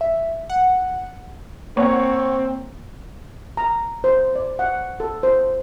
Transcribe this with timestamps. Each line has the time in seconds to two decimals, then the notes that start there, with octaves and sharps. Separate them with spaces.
0.01 E5
0.50 F#5
1.77 A#3 C4 C#5 F#5
3.57 A#5
4.04 C5
4.35 D5
4.59 F#5
5.00 A4
5.23 C5